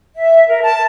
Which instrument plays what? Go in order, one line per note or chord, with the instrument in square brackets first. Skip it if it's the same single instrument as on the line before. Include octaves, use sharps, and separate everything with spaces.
[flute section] E5
A#4
A5